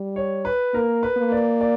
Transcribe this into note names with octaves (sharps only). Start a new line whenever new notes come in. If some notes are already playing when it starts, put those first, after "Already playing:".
Already playing: G3
C#5
B4
A#3 A#4
B4
A#3
D5
D5